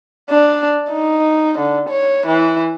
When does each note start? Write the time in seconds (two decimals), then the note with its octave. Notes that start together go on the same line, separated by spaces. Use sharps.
0.30 D4
0.91 D#4
1.59 D3
1.89 C#5
2.27 E3